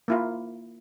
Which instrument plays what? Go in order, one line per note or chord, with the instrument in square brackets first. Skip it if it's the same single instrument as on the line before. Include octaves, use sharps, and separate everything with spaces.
[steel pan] A#3 E4 F4